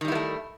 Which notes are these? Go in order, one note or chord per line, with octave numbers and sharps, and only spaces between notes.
D#3 G3 A3 B3 E4